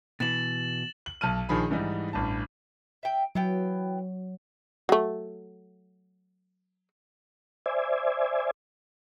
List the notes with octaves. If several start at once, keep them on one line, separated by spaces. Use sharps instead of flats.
B2 E3 A6 E7 F#7
F#7
B1 A5 F6 D#7
A#1 D#3 F3 G#4 B5
G#2 E3 G3 D#4
A1 G2 A5
E5 G5
E3 F#3 B3 G5
F#3 A3
C5 D5 E5 G#5